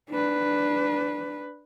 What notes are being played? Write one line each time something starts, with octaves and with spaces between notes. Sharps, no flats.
D4 B4